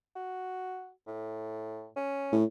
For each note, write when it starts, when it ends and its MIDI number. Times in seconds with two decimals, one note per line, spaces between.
0.15 0.90 66
1.07 1.88 45
1.96 2.36 61
2.32 2.44 45